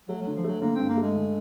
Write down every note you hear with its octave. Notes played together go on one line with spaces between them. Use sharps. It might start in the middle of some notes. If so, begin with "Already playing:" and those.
F#3 A3
D3 F#3
F3
F#3 A3
D3 A#3
G2 C4
A#3
G#3 A3
D3